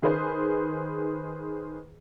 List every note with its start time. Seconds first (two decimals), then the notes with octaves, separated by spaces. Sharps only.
0.02 D#3 G#4 B4 C5